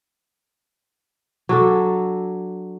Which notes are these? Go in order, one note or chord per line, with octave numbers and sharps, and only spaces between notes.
F#3 D4 A4